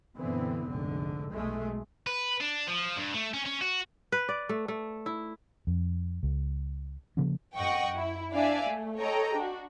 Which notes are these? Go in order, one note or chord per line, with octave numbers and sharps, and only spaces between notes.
F#2 A#2 D3 E3 B3 C4
F1 A#1 G#2 D3
B1 G#3 A3
B4
D4
F3
G2
A3
C#4
C#4
F#4
B4
D5
A3
A3
E4
F2
C#2
C#3 F3 A#3 C#4
F#2 D#5 F#5 G5 C#6
E4
D4 D5 E5 F5 G#5
A3
A4 C#5 D#5 G5 A#5
D4 F#4